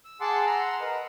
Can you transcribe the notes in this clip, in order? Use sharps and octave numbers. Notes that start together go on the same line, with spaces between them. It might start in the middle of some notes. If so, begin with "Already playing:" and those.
E6
G#4 F#5 A5 C6 D6 E6
F#5 A#5 C6 E6
A#4 B4 D#5 F#5